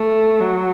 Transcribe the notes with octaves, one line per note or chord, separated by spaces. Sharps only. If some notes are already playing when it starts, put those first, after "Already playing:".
Already playing: A3
F#3